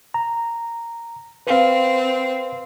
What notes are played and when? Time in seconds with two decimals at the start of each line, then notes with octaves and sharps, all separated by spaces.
0.14 A#5
1.47 C4 B4 F5